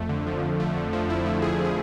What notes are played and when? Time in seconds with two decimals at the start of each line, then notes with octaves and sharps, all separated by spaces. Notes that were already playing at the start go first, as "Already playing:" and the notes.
Already playing: F2 A3
0.09 D3
0.26 F3
0.42 F2
0.60 A3
0.76 D3
0.93 F3
1.09 F2 E4
1.26 A3
1.42 D3 G#4
1.59 F3
1.65 G#4